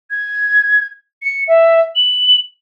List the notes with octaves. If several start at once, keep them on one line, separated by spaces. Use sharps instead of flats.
G#6
C#7
E5
F#7